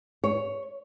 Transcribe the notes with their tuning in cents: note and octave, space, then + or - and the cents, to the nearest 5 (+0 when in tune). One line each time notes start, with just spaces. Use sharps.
C#5 +10